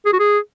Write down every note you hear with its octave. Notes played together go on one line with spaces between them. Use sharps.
G#4
F#4
G#4